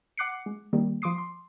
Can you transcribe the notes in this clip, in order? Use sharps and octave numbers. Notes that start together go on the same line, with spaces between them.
F#5 D6 F#6 C7 C#7
G#3
D#3 G3 A#3
F3 C6 D6 D#6 C7
C6